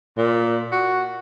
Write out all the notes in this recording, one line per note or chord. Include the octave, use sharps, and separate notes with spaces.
A#2
F#4